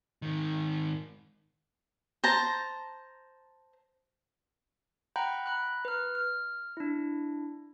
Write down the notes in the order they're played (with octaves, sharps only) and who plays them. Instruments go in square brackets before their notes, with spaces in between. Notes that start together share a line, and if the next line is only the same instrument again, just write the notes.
[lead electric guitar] G#2 D#3
[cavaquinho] C5 A5 A#5
[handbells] F#5 G5 A#5 B5 F#6 G6
A#5 B5 F#6
B4 F6
F6
D4 E4